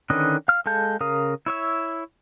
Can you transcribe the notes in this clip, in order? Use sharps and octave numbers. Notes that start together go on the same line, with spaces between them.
D3 D#3 C#4 B4 D#5
F5 F6
G#3 A4 F5 A5 G6
C#3 A#4 F5 D#6
E4 C#5 E5